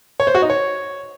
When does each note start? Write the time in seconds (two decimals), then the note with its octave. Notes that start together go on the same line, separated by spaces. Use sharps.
0.20 C#5
0.27 C5
0.35 F#4
0.42 D#4
0.50 C#5